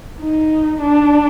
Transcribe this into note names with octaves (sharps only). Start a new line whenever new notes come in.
D#4
D4